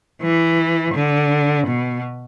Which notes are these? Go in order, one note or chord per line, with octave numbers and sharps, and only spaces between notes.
E3
D3
B2